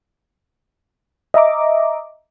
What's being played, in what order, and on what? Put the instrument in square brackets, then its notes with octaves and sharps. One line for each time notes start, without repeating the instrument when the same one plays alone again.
[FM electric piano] D#5 E5 A#5 D6